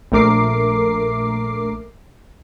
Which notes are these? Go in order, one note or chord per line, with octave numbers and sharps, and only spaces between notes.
A#1 A3 A#4 D6 C7